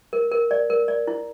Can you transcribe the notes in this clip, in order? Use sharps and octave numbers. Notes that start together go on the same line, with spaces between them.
A#4
A#4
D5
A#4
D5
E4